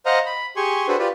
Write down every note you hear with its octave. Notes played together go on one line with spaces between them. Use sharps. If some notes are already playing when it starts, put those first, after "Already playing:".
C5 D#5 F5 F#5 A#5
B5
G4 G#4 G#5 C6 C#6
D4 F#4 G#4 A4 B4 C5
F4 G4 B4 D5